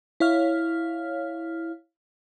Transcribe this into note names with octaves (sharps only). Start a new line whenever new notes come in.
E4 C#5 F5 F6